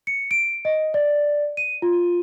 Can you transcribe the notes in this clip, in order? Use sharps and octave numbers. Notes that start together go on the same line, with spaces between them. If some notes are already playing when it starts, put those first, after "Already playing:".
C#7
D7
D#5
D5
D#7
F4